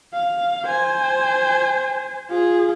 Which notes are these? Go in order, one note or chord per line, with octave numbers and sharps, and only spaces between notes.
F5
C5 G#5
F4 G#4